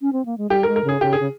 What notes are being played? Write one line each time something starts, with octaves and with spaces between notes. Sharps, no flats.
C#4
C4
A#3
G#3
G3 G4
A#4
G#3
A#4
C#3 G#4
C#3 G4
G#4
C#3